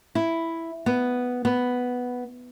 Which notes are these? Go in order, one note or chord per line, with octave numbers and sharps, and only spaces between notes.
E4
B3
B3